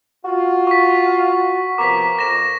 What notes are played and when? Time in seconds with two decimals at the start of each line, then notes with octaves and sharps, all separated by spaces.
0.24 F4 F#4
0.67 C#6 B6
1.78 C3 F3 B3 A#4 D6 B6
2.19 F2 A#6 E7